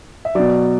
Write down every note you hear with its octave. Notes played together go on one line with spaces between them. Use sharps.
E5
B2 F#3 D5